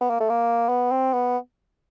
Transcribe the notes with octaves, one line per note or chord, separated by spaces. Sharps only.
B3
A#3
A3
A#3
B3
C4
B3